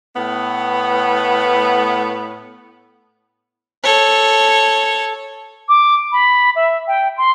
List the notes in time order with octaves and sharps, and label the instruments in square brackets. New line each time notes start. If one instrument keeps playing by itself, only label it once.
[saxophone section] A2 B3
[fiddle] A4 C#5
[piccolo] D6
B5
E5
G5
C6